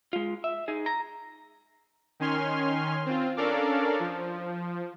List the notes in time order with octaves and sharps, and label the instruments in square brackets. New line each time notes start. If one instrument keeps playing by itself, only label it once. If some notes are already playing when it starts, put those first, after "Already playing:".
[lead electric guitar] G#3 F4
E5
D#4 G#4
A#5
[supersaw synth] D#3 C#4 G#5 C6 F6
C4 F4
C#4 D4 A4 A#4 D5 F5
F3